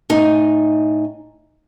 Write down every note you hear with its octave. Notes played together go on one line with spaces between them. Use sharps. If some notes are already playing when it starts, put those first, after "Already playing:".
A2 D#4 G#5